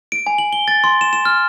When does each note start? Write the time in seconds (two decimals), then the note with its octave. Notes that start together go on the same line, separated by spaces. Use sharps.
0.12 D7
0.27 G#5
0.38 F#7
0.53 G7
0.68 A6
0.84 C6
1.01 E7
1.13 E7
1.25 F6